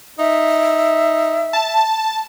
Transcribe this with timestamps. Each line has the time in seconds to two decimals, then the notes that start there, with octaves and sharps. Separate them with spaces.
0.19 D#4 E5
1.53 A5